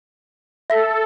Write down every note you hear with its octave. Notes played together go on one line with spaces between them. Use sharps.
A4 E5 A#6 B6